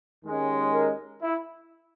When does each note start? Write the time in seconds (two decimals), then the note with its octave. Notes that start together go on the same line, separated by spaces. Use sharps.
0.24 D#2 D#3 G#3 C#4
0.73 A#4
1.22 E4